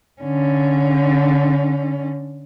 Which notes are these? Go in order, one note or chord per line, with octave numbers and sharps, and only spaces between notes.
D3 C#4